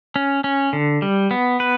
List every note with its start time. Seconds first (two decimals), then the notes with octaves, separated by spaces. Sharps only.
0.16 C#4
0.44 C#4
0.73 D3
1.02 G3
1.31 B3
1.60 B4